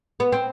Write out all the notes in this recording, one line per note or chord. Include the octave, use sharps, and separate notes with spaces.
B3
C4